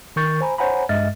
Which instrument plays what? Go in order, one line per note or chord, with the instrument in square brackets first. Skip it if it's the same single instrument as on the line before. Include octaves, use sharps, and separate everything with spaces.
[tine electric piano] D#3 A#4 C#6 G6 A6
C5 G#5 A#5 B5
C5 C#5 F#5 G#5 A#5 B5
G2 G#3 D#5 E5 F6 A6